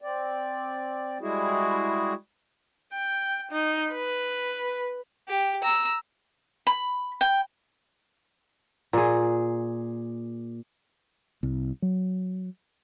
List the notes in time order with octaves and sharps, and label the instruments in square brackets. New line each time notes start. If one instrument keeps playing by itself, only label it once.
[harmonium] C4 D5
G3 G#3 E4 F#4 G#4
[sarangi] G5
D#4
B4
[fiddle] G4
A#5 E6
[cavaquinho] B5
G5
[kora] A#2 G#4
[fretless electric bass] C2
F#3